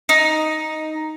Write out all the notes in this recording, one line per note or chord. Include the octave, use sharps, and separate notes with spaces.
D#4